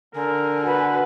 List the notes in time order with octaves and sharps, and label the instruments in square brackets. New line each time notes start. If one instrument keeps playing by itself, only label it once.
[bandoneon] D3 [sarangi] A#4 [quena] G#5
[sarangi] F#4 [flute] B4